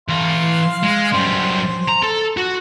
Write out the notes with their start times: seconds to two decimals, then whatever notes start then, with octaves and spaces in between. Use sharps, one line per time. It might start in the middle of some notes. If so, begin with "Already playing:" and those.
0.09 E3 F5 A#5 C6
0.83 G#3
1.13 F#2 G3 C5
1.88 A#5
2.03 A4
2.37 F#4